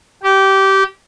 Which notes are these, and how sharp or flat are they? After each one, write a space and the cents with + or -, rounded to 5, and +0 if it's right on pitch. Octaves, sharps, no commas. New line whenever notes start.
G4 -20